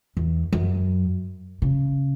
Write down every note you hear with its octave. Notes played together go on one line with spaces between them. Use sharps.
E2
F#2
C#3